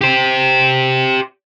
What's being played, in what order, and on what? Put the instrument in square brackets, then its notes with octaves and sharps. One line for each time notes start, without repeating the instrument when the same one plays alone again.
[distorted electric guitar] G4 C5